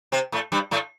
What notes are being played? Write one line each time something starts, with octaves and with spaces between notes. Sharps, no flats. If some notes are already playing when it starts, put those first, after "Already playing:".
C3 C4
A2 A3
G2 G3
A2 A3